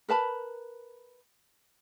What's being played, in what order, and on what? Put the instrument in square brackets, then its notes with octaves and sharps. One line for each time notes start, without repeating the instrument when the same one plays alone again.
[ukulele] A#4 B4 A5 B5